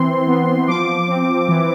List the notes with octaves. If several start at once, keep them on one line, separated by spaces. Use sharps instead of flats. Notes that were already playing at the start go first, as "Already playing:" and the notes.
Already playing: E3 C4 C6
B3
F3 D6
C4
E3